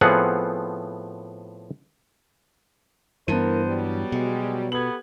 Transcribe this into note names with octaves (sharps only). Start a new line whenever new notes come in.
A2 F3 B3 C4 G#4 F#5
G2 E3 B3 E4 A#4 C5 A5 D#7
F#3 G3
B2 G#3
B3 G4 A4 B4 G#6 F#7